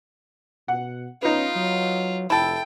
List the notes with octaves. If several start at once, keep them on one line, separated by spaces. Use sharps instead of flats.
B2 F#5
B3 C#4 D#4 F4
F#3
F1 E4 A4 G5